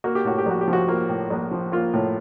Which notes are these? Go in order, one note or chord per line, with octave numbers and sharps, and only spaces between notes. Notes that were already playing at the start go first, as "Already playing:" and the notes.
A#3 F#4
G4
A2 F#4
G4
A#1 F#4
G4
F3
F#4
A#3 F4
A2
A#1
F3
A#3 F4
A2